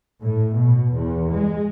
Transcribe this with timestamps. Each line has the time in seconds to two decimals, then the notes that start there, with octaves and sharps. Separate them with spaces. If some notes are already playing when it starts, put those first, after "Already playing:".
0.20 A2
0.54 B2
0.91 E2
1.30 G#3